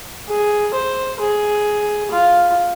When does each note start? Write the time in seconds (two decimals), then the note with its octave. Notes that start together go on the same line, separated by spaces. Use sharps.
0.28 G#4
0.74 C5
1.20 G#4
2.11 F4